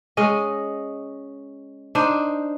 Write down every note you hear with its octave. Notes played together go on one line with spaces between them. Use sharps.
G#3 C#4 D#5
D4 D#4 C5